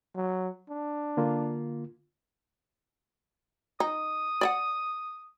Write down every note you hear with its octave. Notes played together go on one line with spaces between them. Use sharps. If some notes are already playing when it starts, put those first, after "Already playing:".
F#3
D4
D3 A#3 F4
D#4 D#6
D5 E5 F#5